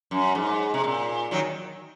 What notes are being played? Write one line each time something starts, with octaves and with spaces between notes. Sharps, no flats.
F#2
G#2
C3
A#2
D#3 F#3